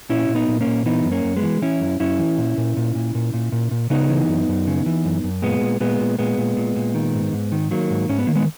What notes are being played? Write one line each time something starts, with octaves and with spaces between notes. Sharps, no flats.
A#2 C#4 E4
A#2
B3 D#4
A#2
A#3 C#4
A#2
E3 B3 D#4
F#2
A#3 C#4
F#2
G#3 B3
E3
E3 C#4 E4
F#2
F#2 C#4 E4
E3
A#2
A#2
A#2
A#2
A#2
A#2
A#2
A#2
C#3 B3 D#4
E3
F#2
F#2
C#3
E3
F#2
F#2
A#2 G#3 B3
A#2
A#2 G#3 B3
A#2
A#2 G#3 B3
A#2
A#2
A#2
D#3
G#2
G#2
D#3
D#3 F#3 A#3
G#2
G#2 C#4
B3
D#3 A#3
G#3 B3